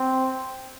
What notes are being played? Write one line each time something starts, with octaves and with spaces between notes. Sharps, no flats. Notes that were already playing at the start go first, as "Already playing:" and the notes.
Already playing: C4